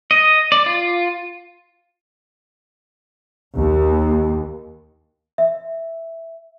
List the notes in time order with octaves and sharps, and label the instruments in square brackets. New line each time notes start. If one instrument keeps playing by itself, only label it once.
[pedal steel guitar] D#5
D5
F4
[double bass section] D#2
[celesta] E5